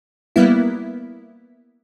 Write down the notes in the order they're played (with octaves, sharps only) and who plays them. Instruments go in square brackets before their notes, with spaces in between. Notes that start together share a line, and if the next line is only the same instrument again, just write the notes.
[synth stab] G3 A#3 B3 E4